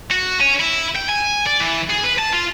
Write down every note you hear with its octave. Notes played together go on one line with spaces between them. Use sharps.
F#4
C#4
E4
G5
G#5
D5
E3
G#4
B4
A5
F4